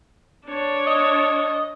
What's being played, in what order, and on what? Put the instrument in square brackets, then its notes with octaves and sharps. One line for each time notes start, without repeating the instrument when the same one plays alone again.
[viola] D4 C#5
[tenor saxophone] D#5